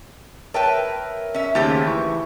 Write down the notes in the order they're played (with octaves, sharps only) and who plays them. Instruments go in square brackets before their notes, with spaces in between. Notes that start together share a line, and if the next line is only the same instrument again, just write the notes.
[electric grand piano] A#4 C#5 E5 [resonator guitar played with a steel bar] B4 G5 A5
[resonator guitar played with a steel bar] C#4 E5
[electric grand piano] D#2 C#3 [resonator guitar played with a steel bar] A3 G4 C5
[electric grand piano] E3 C#6